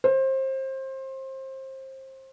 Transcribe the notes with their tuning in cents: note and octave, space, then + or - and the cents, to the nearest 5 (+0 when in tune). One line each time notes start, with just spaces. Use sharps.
C5 +25